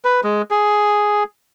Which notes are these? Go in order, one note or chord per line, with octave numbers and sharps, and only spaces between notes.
B4
G#3
G#4